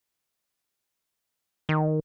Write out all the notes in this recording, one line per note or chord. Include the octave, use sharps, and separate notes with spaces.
D#3